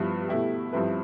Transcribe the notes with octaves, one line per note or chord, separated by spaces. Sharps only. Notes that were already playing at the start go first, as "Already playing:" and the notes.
Already playing: G2 F3 B3 E4 B4
B2 A3 E4 G4
G2 F3 C4 E4 B4